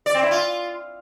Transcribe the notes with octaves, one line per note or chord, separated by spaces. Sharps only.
D5
C4
E4
F4